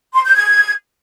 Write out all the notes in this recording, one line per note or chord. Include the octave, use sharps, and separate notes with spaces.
C6
G6
G#6